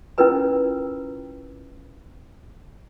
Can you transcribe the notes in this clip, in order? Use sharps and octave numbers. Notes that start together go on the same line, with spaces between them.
C#4 E4 F4 A#4 B4 B5